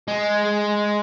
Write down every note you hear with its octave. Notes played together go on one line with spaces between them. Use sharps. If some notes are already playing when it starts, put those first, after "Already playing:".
G#3